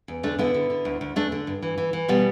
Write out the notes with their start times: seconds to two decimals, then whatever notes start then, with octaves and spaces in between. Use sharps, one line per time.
0.08 E2
0.23 D3 A3 D4
0.38 D3 B3 E4
0.54 D3
0.70 D3
0.85 D2
1.01 D2
1.16 E2 A3 D4
1.32 D3
1.47 G2
1.62 E3
1.78 E3
1.93 E3
2.08 B2 G3 B3